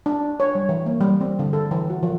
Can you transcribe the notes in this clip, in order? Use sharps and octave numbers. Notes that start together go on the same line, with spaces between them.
D4
C#5
G3
E3
A#3
G3
C4
D3
A4
E3
F#4
F3